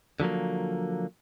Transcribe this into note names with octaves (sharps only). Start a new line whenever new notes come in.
D3 F3 F#3 A#3